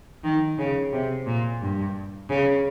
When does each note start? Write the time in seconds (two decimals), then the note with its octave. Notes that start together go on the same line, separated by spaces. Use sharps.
0.24 D#3
0.58 C#3
0.92 C3
1.26 A#2
1.61 G2
2.29 C#3